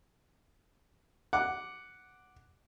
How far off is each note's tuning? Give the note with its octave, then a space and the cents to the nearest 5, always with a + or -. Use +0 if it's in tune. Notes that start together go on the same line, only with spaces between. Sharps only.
F#5 +0 D6 +0